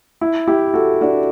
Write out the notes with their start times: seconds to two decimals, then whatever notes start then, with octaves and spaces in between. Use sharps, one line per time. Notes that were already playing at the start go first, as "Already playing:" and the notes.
0.21 E4
0.47 E4 G4
0.74 F#4 A4
1.01 D4 F#4